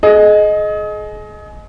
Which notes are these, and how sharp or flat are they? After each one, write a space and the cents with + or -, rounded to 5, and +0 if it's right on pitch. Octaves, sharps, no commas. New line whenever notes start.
G#4 +35 D#5 +0